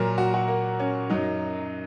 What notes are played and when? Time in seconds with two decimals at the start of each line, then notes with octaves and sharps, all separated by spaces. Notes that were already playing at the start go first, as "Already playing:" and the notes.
Already playing: A#2 F#3 A#4
0.18 F#4
0.34 F#4
0.48 A#3
0.79 C#4
1.10 F#2 F#3 D#4